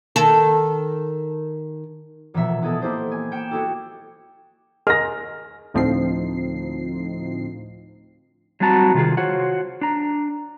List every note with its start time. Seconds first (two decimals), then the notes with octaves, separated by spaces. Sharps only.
0.16 D#3 A4
2.34 E1 A#2 E3 F3 E5 F#5
2.62 B3 E4 G#4 A4 D#5 A5
2.81 A#3 E4 G4 C5 D#5
3.11 G#5
3.31 A#3 G5 C#7 D7 E7
3.51 G#3 E4 F#4 G4 A4
4.87 G#4 A#4 D#5 F6 A#6
5.74 D2 A2 F3 C4 D#4 C7
8.60 F#3 G3 C4 F#4 A5 A#5
8.94 C3 D#3 F4 G#4
9.17 F4 F#4 C5 C#5 F#5
9.81 D4 A#5